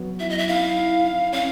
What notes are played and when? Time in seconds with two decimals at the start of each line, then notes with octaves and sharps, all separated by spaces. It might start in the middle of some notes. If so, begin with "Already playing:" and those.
Already playing: F#3 B3
0.20 E4 E5
0.30 D#5
0.38 E5
0.48 E4 F5
0.76 E4
1.04 E4
1.33 C#4 F5